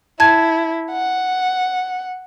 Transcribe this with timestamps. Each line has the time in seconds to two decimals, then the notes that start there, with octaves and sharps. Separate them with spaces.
0.20 E4 A5 G#6
0.91 F#5